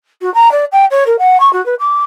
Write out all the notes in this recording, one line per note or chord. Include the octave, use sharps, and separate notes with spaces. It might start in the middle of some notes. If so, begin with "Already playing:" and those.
F#4
A#5
D5
G5
C#5
A#4
F#5
C#6
F#4
B4
D6